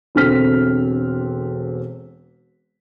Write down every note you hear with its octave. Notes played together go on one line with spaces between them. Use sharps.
E1 D3 C4 F6 B6